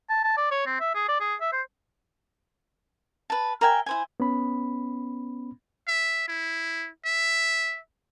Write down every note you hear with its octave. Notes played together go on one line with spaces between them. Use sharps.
A5
A5
D5
C#5
C4
E5
G#4
D5
G#4
E5
C5
B4 A5
A#4 E5 G5 G#5
E4 C5 G#5
B3 C#4 B5
E5
E4
E5